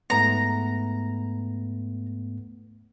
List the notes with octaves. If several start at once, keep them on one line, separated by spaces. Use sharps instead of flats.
G#2 A3 B3 A#5